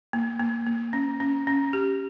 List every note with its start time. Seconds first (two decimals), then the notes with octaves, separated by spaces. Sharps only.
0.13 A#3
0.40 A#3
0.66 A#3
0.93 C#4
1.20 C#4
1.47 C#4
1.73 G4